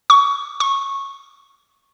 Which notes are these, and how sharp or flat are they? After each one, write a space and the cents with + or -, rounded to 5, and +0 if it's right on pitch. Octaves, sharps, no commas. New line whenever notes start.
C#6 +20
C#6 -10